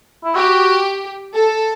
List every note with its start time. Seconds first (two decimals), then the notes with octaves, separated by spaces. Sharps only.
0.24 E4
0.35 F#4 G4
1.35 A4